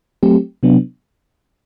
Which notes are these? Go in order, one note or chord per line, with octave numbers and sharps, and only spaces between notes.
F#3 A3 C4 G4
C3 F#3 B3 D4